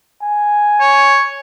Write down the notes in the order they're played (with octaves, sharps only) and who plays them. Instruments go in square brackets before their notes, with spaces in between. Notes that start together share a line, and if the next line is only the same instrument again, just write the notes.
[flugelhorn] G#5
[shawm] C#5